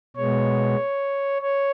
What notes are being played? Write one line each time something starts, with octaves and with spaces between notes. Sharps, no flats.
B2 G#3 B3 C#5
C#5